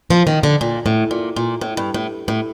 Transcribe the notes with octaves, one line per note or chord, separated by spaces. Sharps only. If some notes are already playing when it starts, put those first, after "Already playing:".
F3
D#3
D3
A#2
A2
A#2
A#2
A2
G2
A2
A2